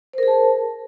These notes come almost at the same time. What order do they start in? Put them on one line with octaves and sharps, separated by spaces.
C5 A#4 G#4 A5